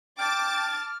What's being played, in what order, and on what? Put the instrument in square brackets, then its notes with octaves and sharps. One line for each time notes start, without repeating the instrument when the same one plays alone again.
[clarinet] G5 [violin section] A5 D6 A6 [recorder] F6